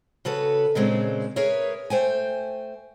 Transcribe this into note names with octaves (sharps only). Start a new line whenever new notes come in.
C#3 F#4 A4 B4
A#2 C#3 G#3 C4 D4
G#4 A#4 B4 C#5 E5
A3 C5 G5 G#5